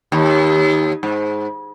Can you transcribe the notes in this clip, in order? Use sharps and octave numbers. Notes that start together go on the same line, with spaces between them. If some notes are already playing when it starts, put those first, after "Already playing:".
D#2
G#2